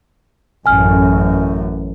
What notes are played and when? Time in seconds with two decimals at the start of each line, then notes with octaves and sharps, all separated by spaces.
0.66 A1 F#2 G#5 F6